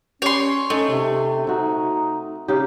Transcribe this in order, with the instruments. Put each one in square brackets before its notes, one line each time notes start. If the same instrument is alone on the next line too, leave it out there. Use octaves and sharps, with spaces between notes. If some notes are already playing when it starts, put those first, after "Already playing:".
[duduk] C#4 [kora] G4 [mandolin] C#5 C6
[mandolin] A3 [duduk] C#4 [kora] D#4
[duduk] C3
[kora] C4 F#4 [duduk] D#4
[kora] C#3 G4 [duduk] D#4